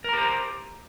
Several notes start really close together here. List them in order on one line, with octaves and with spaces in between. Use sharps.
A#4 A#5 G4 C5